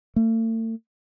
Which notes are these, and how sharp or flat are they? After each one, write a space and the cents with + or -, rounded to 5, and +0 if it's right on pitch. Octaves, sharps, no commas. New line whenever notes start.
A3 +40